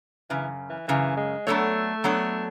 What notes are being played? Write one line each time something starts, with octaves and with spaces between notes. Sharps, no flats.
F#2 C#3 E3
E3
F#2 C#3 E3
G#3
F#3 A3 B3 D4 A4 C#5
F#3 B3 D4 A4 C#5